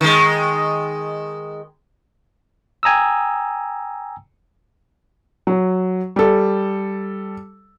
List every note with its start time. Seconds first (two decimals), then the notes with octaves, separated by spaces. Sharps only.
0.01 D#3 G#3
2.83 G5 G#5 A#5 D#6 E6
5.47 F#3
6.16 G3 A4